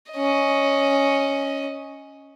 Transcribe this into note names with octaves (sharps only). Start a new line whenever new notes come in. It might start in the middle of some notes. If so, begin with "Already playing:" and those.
C#4 D#5